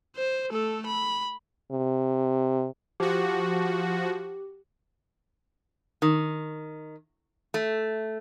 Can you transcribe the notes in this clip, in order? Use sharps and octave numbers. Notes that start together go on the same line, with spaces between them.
C5
A3 A4
B5
C3
F3 F#4 G4
D#3
A3